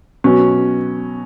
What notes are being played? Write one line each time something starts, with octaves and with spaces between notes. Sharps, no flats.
B2 F#3 C#4